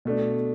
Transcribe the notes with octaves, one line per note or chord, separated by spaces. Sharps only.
B2 A3 D4